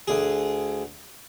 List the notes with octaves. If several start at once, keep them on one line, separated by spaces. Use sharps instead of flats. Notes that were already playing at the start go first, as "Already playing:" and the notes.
D2 G#4